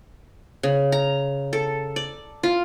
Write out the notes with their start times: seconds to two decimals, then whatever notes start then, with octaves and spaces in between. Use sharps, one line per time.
0.63 C#3
0.92 A#5
1.53 A4
1.96 D5
2.43 F4